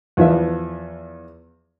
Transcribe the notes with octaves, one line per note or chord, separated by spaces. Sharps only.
E2 F3 B4 E5